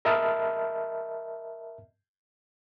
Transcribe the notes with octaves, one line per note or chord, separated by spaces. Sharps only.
A#4 D#5 E5 A5 B5 F6